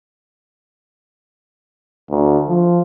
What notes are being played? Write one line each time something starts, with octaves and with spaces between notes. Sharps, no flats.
D2
F3